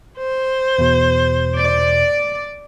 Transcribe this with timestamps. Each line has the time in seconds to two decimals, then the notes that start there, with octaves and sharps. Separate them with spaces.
0.18 C5
0.78 E2 B2
1.58 D5